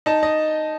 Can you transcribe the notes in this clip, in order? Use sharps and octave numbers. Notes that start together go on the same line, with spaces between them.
D#4 A5
D#5